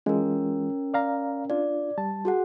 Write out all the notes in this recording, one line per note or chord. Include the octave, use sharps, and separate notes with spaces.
E3 G#3 C#4 F4 A#4
D5 F5 A#5
D4 F4 D5
G3 A5
F#4 G#4 F#5